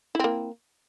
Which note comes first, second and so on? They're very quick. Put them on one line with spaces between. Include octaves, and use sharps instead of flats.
E4 C4 A#3